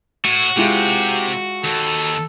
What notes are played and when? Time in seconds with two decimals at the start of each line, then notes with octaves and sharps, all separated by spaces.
0.25 A2 F#4
0.57 C3 G#3 E4 F4 G4
1.64 D#2 A4